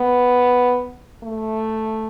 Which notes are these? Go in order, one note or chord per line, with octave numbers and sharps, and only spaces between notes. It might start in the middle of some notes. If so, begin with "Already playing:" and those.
Already playing: B3
A3